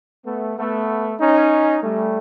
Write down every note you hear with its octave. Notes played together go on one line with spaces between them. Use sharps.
A3 B3
A3 B3
C#4 D#4
G3 A3